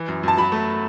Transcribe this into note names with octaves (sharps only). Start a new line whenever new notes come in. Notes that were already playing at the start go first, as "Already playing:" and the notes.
Already playing: E3
F#2
F#2 A5
F#3 B5
A3